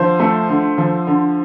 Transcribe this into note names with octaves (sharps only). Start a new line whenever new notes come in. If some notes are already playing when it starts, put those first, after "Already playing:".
Already playing: D3 F3 C5
A3
D3
F3
D3